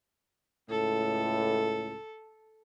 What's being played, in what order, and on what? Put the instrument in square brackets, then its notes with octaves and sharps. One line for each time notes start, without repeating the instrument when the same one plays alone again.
[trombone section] C#2 A2 [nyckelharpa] A4